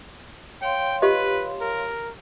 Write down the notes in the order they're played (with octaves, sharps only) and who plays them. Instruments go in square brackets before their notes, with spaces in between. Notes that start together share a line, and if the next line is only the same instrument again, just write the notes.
[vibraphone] C#5 F5 C6 [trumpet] G5
[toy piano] F4 G4 D#5 [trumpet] B4
[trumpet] A#4